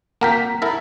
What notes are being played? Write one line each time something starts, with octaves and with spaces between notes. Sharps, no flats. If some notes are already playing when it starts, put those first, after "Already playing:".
A#3 A#4 F#5 G5 A#5 B6
E4 A4 A#4